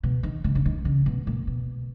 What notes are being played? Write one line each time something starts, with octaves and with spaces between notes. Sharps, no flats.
B2
D#3
C#3
C#3
D#3
C#3
B2
A#2
B2